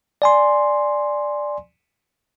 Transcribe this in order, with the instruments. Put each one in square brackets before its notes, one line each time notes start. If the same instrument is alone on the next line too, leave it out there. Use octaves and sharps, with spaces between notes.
[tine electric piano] D5 G#5 C6